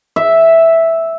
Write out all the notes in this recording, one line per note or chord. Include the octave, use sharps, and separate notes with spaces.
E5